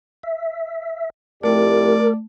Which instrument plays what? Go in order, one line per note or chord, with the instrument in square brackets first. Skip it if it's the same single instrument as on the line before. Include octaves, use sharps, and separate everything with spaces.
[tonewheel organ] E5
[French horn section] F2 E4 G4 [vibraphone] A3 [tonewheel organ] A#4 [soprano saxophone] D5